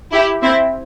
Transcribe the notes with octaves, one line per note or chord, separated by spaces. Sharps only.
E4 G4
C4 E4